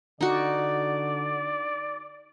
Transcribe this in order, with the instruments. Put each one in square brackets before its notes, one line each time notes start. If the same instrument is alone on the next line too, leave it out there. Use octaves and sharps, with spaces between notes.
[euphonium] D3 [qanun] D#4 F#4 [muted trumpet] D5